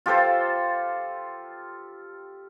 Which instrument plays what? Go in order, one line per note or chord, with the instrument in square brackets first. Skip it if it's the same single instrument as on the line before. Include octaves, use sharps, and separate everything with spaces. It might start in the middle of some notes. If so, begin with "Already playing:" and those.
[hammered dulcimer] F4 G4 A4 C5